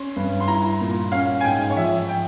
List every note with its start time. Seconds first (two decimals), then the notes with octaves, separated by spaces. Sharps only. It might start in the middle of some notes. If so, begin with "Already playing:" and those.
Already playing: C#4 C6
0.17 G2
0.40 C6
0.48 E4 A#5
0.81 A#2
1.12 C#4 F5
1.41 G#5
1.44 G#2 G5
1.70 C#5
1.76 F3 E5
2.08 G5